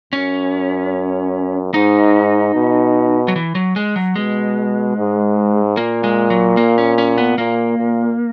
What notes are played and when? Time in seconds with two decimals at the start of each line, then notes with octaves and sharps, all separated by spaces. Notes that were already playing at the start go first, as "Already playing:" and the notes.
0.13 F#2 C#4
1.74 G#2 D#4
2.54 B2
3.28 F#3
3.36 E3
3.55 F#3
3.76 G#3
3.96 F#3
4.16 B2 G#3
4.96 G#2
5.77 A#2 A#3
6.04 G#3
6.30 F#3
6.57 A#3
6.78 C#4
6.98 C#4
7.18 B3
7.38 A#2 A#3
7.78 A#2